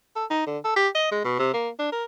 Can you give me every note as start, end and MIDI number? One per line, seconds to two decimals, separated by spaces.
0.16 0.25 69
0.30 0.44 63
0.47 0.58 50
0.64 0.75 69
0.76 0.88 67
0.95 1.08 75
1.12 1.21 56
1.25 1.36 47
1.39 1.52 48
1.54 1.69 58
1.79 1.89 62
1.92 2.04 70